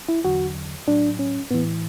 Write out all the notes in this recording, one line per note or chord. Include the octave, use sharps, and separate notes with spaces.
E4
E2 D3 F#3 F#4
A2 F#3 D4
C#4
A2 E3 B3